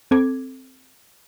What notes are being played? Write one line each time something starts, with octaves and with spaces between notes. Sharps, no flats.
C4 A4 D6 G#6